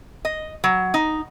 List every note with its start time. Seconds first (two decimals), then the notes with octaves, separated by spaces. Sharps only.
0.25 D#5
0.64 F#3
0.94 D#4